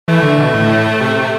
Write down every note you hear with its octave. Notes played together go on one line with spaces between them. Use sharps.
E3 A3
D3
B2
A2
C3
C3